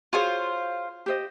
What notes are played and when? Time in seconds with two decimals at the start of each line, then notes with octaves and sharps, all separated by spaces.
0.13 F4 F#4 G#4 C5 C#5 F5
1.06 G4 C5 D#5